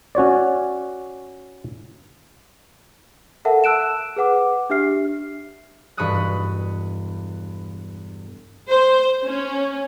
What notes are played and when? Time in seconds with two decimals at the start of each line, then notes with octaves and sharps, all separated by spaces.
0.15 C#4 F#4 C#5 D5
3.45 A4 A#4 E5 F#5 A5
3.64 A5 E6 F#6 D7 E7
4.16 G#4 B4 F#5 D6
4.70 D4 G4 E5 F6 C7
5.97 E1 G2 B5 C#6 D#6 F#6
8.70 C5
9.25 C#4